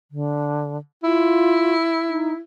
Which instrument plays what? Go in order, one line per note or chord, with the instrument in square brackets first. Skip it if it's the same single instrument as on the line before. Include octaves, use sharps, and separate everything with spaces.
[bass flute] D3
[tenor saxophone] E4 [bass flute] F4
[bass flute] D#4